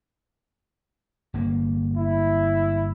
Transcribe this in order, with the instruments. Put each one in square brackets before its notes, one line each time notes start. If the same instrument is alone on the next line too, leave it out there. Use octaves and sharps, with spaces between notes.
[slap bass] G1 A#3
[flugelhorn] E4